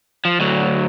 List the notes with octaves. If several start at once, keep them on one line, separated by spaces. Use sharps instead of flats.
F3
D2 F#3